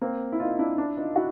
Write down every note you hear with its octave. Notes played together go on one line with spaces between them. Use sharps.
A#3 C4
E4
D#4 F4
D4 E4
D4 E4
D#4 F4
E4 F#4